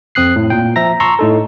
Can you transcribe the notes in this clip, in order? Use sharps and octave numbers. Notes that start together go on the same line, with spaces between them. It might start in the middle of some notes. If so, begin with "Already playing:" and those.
F2 C4 D#6 F#6 C7
A2
A#2 G5
F3 E5 A#5 A#6
A5 A#5 C6 C#6 E6
A2 D#4 A4